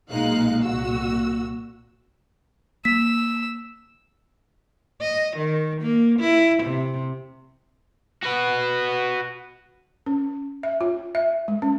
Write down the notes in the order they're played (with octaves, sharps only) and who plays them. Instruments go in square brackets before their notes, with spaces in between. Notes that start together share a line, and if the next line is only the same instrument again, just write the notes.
[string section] B1 A#2 G#3 D#4 F5 F#6
C2 A#2 F#4 E6
[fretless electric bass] A#3 [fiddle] E6 [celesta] B6
[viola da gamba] D#5
D#3
A#3
E4
C3
[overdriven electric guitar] F#4 B4
[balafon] C#4
E5
F4
E5
G#3
C#4